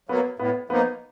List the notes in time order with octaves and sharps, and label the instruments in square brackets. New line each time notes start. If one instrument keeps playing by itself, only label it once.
[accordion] F#3 A#3 [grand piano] B3
[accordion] A2 [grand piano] B3
[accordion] F3 A#3 D#4 [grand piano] B3